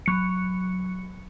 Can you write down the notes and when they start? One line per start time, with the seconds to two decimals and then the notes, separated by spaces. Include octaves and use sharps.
0.06 F#3 C#7